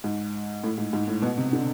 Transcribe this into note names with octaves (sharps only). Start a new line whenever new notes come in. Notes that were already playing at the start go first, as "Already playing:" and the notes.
G#2
A2
G#2
G#2
A2
B2
C3
D3